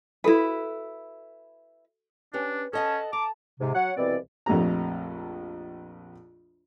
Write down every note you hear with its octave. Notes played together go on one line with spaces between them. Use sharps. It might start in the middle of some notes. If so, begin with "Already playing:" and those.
E4 F#4 A4 B4 F5
C#4 D4 G4 B4
C#4 A4 D#5 F#5 A5
A#5 D6
G#2 C3
F#3 C#5 F#5
C2 B2 E3 C4 D5
A#1 F2 A3 G4 A#5